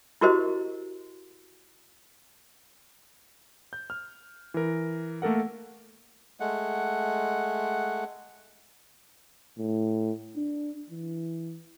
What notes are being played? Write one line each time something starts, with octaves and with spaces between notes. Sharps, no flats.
E4 F#4 G4 A#4 C5 D#5
G6
F6
E3 A#4
A3 A#3 A4 A#4 F#5
G#3 A3 F#5
A2
D4
E3